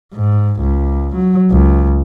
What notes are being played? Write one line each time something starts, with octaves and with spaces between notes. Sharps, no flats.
G#2
C#2
F#3
C#2